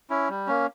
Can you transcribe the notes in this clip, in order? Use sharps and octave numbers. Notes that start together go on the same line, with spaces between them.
C#4 E4
G3
A#3 C#4